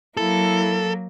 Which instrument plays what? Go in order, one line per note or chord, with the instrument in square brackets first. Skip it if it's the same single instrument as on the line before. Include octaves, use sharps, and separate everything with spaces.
[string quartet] F#3 A#3 [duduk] E4 [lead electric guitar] A4